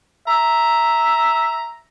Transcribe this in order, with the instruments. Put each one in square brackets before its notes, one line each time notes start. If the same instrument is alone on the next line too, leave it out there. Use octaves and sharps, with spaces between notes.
[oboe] E5 [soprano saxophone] A#5